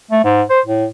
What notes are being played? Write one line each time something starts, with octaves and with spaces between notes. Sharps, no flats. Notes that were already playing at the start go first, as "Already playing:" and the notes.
A3
G#2
C5
A2